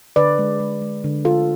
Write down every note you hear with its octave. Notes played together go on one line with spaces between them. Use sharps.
D3 B4 D5
G#3
G#3
G#3
D3
D3 F4 A4